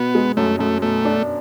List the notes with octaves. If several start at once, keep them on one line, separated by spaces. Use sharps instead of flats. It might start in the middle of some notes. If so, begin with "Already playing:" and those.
Already playing: B2 B3
G#3
F#2 A3
F#2 A3
B2 A3
D4